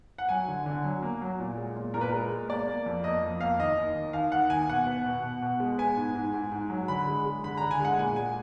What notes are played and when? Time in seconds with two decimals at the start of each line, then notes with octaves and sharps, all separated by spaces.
0.18 F#5
0.29 F#3 G#5
0.48 D3
0.66 D3
0.84 F#3
1.02 A#3
1.21 F#3
1.39 A#2
1.57 G#3
1.76 A#2
1.94 A#2 A#4
2.01 B4
2.08 G#3 A#4
2.30 G#3
2.49 A#3 D5
2.68 A#3
2.86 F2
3.04 A#3 D#5
3.23 F2
3.41 A#3 F5
3.58 D#2 D#5
3.77 D#2
3.95 D#3
4.13 D#2 F5
4.32 D#3 F#5
4.50 D#2 G#5
4.68 B2 F#5
4.87 B3
5.06 B2
5.23 B2
5.42 B2
5.60 G#3
5.78 B3 G#5
5.97 G#2
6.15 G#2
6.34 G#2
6.52 G#2
6.70 F#3
6.88 D3 B5
7.07 G#3
7.25 G#3
7.44 D3 B5
7.58 D3 A#5
7.71 G#5
7.80 G#3 F#5
7.99 A#2 G#5
8.16 G#3 G#5